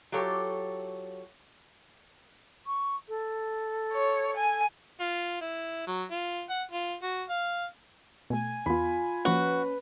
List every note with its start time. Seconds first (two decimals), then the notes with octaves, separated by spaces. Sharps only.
0.12 F#3 F4 G4 A4 C#5
2.67 C#6
3.08 A4
3.93 C#5
4.37 G#5
5.00 F4
5.41 E4
5.87 F#3
6.11 F4
6.50 F#5
6.72 F4
7.02 F#4
7.29 F5
8.30 B2 A3 G#5
8.66 E2 B3 F4 B5
9.25 F3 A#3 C#4 F#4 B4